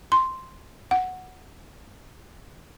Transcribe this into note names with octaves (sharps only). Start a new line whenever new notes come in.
C6
F#5